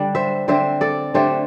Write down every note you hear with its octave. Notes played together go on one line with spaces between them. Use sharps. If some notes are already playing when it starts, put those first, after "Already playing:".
Already playing: D3 G3 D4
C5 E5
D3 C4 C5 E5
A4 D5
D3 A3 D4 G4 C5